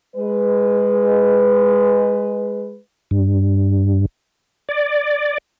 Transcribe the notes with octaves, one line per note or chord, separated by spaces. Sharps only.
G#3 B4
G2
D5